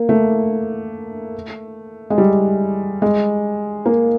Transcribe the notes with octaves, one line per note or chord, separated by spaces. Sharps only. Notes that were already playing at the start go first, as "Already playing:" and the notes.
Already playing: A#3
A3
G#3
G3
G#3
A#3